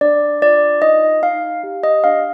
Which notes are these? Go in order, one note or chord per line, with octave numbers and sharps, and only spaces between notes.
D4 D5
F4 D5
D#4 D#5
D#4 F5
G4
D#5
D4 F5